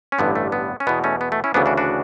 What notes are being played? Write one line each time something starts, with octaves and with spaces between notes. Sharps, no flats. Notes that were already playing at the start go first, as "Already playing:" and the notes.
C#4
A1 G2 D3 B3
A3
B3
C#4
E2 B2 B3
A3 C#4
B3
A3
C#4 E4
D2 C#3 E3 B3 D4
D4 F#4
D4 F#4